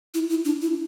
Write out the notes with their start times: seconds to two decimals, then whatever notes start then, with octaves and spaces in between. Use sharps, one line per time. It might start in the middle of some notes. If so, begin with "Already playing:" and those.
0.14 E4
0.29 E4
0.45 D4
0.62 E4